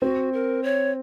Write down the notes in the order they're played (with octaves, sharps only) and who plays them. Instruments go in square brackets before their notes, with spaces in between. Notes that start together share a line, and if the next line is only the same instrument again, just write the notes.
[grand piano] C4 [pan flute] F#4
[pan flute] A#4
C#5